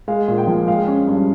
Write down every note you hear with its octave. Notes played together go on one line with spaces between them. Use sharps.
G#3 F5
A#2
G5
F3
G#3 F5
C#4
G2